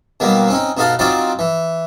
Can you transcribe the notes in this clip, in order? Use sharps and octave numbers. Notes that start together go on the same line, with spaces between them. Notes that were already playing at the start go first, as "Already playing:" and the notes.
B2 D#3 F#3 G3 A#3
C4 C#4 D#4
B2 D#4 F#4 A4 F5 D#6
F#3 C4 D#4 F4 C5 D5
E3